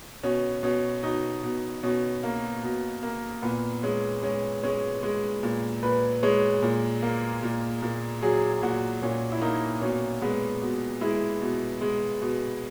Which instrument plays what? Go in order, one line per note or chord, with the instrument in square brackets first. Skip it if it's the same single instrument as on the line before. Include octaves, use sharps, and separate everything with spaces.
[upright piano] B2 C#4
B2 C#4
B2 D#4
B2
B2 C#4
A#3
B2
A#3
A#2 B3
G#3 C#4
G#3 C#4
G#3 C#4
G#3
A#2
A#2 B4
G#3 C#5
A#2
A#3
A#2
A#2
F#3 G#4
A#2 F#4
A#2 C#4
E4
A#3 D#4
B2 C#4
G#3 B3
B2
G#3 E4
B2
G#3
B2